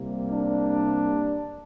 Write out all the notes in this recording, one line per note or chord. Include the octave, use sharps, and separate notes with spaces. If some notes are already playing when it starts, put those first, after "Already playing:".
Already playing: C2 C3 G3 A#3
D4